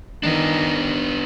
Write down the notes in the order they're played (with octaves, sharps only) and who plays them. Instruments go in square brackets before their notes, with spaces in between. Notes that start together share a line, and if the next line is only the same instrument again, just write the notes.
[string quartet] D#3 [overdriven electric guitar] B3 D4